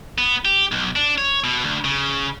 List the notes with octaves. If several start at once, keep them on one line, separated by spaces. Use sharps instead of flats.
B3
G4
B1
D4
C#5
B2
D2
C#3